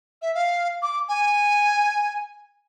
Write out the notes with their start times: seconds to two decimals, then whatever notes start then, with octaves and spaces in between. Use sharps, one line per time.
0.22 E5
0.35 F5
0.82 D6
1.08 G#5